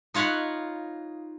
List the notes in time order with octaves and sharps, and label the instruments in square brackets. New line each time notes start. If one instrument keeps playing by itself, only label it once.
[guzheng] D#4 F4 C#5 F#5 B5